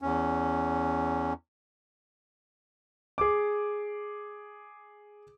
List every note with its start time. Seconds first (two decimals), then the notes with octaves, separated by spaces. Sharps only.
0.02 E2 C#4
3.18 G#4 D6